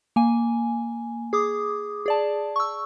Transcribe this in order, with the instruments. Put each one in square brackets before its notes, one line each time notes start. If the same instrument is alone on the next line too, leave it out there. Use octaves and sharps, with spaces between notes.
[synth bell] A#3 G#5
G#4 D6 D#6
G#4 D5 A5
C#6 E6